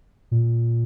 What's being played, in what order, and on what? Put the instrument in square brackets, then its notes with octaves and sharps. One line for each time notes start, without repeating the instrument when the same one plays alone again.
[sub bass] A#2